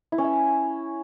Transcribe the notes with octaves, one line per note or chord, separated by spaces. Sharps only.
E4
C#4
E5